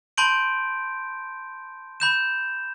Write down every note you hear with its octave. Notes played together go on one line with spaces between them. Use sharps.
A5 B5 C6 G6 D7
B5 G6 E7